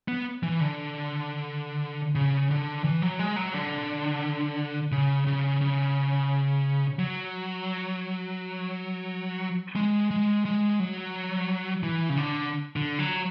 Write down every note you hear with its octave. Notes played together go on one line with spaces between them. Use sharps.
B3
E3
D3
C#3
D3
E3
F#3
G#3
F#3
D3
C#3
C#3
C#3
F#3
G#3
G#3
G#3
F#3
E3
C#3
D3
D3
F#3